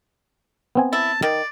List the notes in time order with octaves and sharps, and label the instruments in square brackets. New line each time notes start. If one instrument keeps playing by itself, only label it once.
[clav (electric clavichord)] B3 C4 G#5
[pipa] E4 [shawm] A5
[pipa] D#3 [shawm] D5